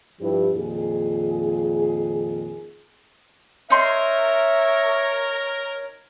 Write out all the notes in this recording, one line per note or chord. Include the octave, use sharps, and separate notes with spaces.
G2 F3 E4 G4 B4
F2 A#2 D#3 G#4
D#4 A#4 C#5 E5 C6